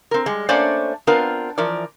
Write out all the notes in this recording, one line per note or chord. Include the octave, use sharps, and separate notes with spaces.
C4 A#4
G3 G#3
A3 A#3 C#4 D4 C5 D5
B3 C4 D4 F4 A#4 B4
E3 F3 A#4 D5